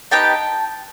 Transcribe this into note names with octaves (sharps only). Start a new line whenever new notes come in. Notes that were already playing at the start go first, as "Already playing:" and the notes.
B3 D#4 G4 G5 A5